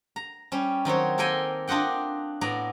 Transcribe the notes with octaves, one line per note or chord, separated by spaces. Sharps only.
A#5
G3 C#4
D#3 F#3 C4 C#5
A#3 A4 A#4 G5 G#5 C6
D4 F4 D#5 F#5 G5
A2 B3 D5 A#5